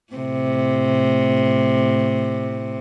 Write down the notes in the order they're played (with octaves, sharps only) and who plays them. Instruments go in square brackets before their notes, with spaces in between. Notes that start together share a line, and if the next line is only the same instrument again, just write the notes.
[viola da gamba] A2 C3